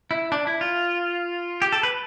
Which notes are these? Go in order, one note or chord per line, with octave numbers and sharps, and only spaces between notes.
E4
D4
E4
F4
G4
A4
B4